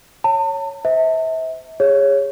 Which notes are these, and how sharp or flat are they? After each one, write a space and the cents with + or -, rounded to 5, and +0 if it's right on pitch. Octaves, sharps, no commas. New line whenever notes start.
C#5 +0 A5 +40
C5 -25 E5 -35
G#4 -25 C#5 +0